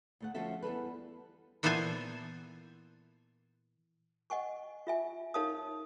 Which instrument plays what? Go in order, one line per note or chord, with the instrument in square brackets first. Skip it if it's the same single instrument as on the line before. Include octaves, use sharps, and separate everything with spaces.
[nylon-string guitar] D2 A3 F#5
D2 F3 C#4 F#4 A4 E5
E2 G3 A4 B4
[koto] A#2 E3 B3 A4 C5 G#5
[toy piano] D#5 F#5 G#5 C#6
F4 E5 G#5
D#4 A#4 C#5 F5 A5 D#6